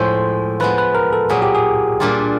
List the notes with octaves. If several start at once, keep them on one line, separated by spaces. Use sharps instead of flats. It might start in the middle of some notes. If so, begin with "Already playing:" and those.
Already playing: A2 F3 G#3 C5
F3 G#3 B3 B4
B4
A#4
A4
A#2 F#3 B3 G#4
G4
G#4
A#2 G3 A#3 D4 F4